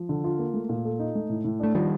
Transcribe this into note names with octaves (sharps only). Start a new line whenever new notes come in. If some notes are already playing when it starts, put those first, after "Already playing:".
Already playing: F3
D3
F4
A#3
A3
A#2
A4
D#4
A3
A2
A2
A3 D4
D#3 F3 G3